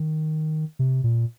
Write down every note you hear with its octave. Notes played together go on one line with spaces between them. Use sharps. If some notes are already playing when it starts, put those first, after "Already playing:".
Already playing: D#3
C3
A#2